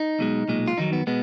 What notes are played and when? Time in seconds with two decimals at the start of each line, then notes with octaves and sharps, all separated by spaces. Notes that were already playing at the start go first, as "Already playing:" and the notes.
Already playing: D#4
0.19 B1 B2 G#3
0.48 B1 A#2 G#3
0.68 F4
0.77 F2 D#3 F#3 D#4
0.93 B3
1.07 B2 G#3 B3